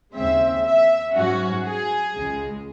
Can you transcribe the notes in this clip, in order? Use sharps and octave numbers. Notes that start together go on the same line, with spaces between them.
D#2 C#3 G#3 C4 E5
E5
G#2 F#3 C#4 F#4
G#4
C#2 C#3 G#3